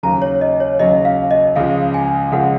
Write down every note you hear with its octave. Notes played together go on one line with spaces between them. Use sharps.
D#2 C#3 F#3 A#5
C#5
D#5
C#5
D#2 C#3 F#3 D#5
F5
D#5
C#2 C#3 F3 G#3 F5
G#5
C#2 C#3 F3 G#3 F#5